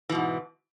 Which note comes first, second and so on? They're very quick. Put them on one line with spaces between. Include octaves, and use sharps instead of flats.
E3 B2 G#2